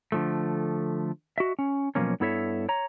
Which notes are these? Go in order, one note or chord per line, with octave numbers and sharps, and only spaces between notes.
D3 F3 A3
F#4 D#5 E5
C#4
B2 F3 F#3 A#3 C#4
G2 B3 E4 A4 C#5 E5
C#5 A#5